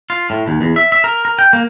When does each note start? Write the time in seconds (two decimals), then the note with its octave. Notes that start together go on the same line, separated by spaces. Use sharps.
0.10 F4
0.30 A2
0.48 D#2
0.61 E2
0.76 E5
0.92 E5
1.04 A#4
1.25 A#4
1.39 G5
1.53 A#3